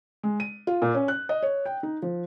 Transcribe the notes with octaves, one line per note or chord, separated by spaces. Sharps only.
G#3
D#7
F4
A#2
C#4
F#6
D#5
C#5
G5
D#4
F3